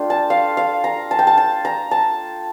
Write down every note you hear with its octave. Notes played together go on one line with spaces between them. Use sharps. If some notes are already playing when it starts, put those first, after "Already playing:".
Already playing: A3 D4 F4 G5
A5
F5
F5
A#5
A5
G5
A5
A5
A#5
A5